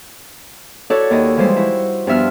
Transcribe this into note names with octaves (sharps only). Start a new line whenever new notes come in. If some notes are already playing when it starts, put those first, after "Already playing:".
E4 F#4 A4 C#5 D5
D#2 D#5
E3 F3 G3 G#3 C5
E4 F#4
G2 F3 B3 E5 F6